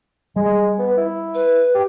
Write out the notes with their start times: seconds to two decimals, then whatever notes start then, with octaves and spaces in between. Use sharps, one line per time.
0.36 G3 G#3
0.79 B3
0.97 E4
1.35 B4
1.74 G4